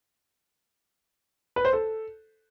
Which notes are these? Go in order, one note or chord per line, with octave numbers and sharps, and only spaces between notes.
B4
C5
A4